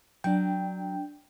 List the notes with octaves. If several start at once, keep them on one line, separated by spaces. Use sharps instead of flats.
F#3 D4 G5